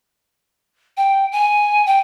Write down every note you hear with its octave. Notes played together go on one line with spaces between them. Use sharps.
G5
G#5
G5